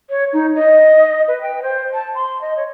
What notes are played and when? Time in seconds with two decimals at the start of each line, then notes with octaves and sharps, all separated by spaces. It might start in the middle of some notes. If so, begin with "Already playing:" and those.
0.10 C#5
0.33 D#4
0.56 D#5
1.28 B4
1.42 G5
1.62 C5
1.94 A5
2.15 C6
2.41 D#5
2.57 C#5